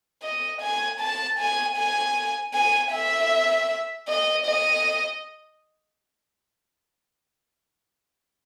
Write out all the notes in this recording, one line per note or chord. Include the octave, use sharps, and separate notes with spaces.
D#5
G#5
A5
G#5
G#5
G#5
E5
D#5
D#5